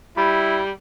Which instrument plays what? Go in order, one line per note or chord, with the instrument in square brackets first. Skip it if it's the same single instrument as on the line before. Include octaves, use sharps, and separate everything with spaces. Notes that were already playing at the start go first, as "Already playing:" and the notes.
[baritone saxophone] G3 [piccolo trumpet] E4 [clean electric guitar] B5